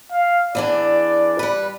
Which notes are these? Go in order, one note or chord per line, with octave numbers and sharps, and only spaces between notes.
F5
E2 E3 D4 D5
G3 B4